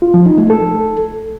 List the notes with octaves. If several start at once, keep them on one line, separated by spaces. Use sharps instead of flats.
F4
F3
D#4
A3
A4